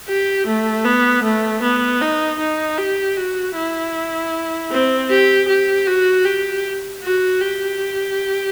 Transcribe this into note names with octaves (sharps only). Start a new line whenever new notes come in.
G4
A3
B3
A3
B3
D#4
D#4
G4
F#4
E4
C4
G4
G4
F#4
G4
F#4
G4